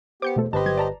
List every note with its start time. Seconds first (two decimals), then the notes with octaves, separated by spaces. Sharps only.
0.22 B3 G4 C5 D6 G6 C#7
0.36 E2 B2 A3 A4
0.53 G1 G4 B4 C5 D#5 A5 B5
0.66 F#3 G#6
0.78 D5 A5 A#5